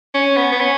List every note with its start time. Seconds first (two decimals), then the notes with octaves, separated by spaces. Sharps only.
0.14 C#4
0.37 B3
0.52 B3
0.61 C#4